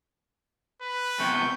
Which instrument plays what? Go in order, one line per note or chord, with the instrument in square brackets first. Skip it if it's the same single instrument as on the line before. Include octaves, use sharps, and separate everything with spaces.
[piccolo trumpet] B4
[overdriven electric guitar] E2 C3 [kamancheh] G5 [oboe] C#6